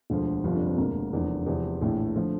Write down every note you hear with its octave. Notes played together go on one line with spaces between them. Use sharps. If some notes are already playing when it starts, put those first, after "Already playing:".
E1 D2 D3 F3
G1 F2 C3 F3 F4
D4
C4
E1 D2 D3 A#3
F1 E2 D3 F3
E2 C3 F3 C4
A#1 A2 E3 A3
D3 F3 A3